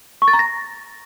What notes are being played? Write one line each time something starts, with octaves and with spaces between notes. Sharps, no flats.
C#6
A6
A#5
A#6